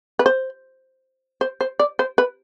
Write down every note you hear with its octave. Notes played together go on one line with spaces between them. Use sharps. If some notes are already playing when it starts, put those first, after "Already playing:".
B4
C5
C5
C5
D5
C5
B4